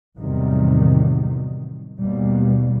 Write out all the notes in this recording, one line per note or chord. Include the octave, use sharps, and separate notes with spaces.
E2 A2 C3 D#3 F#3 G3
D#2 B2 G3